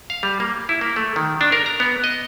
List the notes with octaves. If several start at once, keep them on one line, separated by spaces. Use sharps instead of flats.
F5
G3
A#3
E4
A#3
A3
D#3
D4
A#4
A#5
B3
D#5